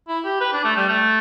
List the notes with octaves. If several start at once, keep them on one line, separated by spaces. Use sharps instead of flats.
E4
G4
B4
D4
A3
G3
A3